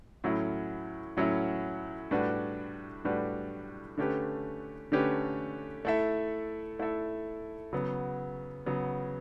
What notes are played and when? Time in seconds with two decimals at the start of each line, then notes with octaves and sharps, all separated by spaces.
0.24 A2 F#3 C#4 E4
1.17 A2 F#3 C#4 E4
2.11 A2 G3 D4 F#4 B4
3.05 A2 G3 D4 F#4 B4
3.97 D3 A3 C#4 G4 B4
4.92 D3 A3 C#4 G4 B4
5.85 A3 E4 A4 E5
6.79 A3 E4 A4 E5
7.73 C#3 F#3 B3
8.66 C#3 F#3 B3